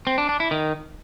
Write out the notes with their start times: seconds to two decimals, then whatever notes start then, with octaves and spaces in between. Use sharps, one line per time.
0.07 C4
0.18 D4
0.29 D4
0.40 E4
0.51 D#3